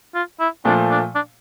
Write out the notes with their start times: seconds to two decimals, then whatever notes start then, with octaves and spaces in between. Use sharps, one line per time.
0.15 F4
0.40 E4
0.65 A#2 F3 A3 D4
0.90 D4
1.15 D4